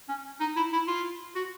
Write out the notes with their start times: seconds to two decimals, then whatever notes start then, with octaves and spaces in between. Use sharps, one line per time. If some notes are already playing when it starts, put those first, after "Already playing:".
0.09 C#4
0.40 D#4
0.56 E4
0.73 E4
0.88 F4
1.35 F#4